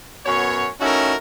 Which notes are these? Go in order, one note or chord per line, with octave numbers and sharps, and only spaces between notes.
F#2 B2 B3 C#5
A3 C#4 D#4 E4 F#4 A#4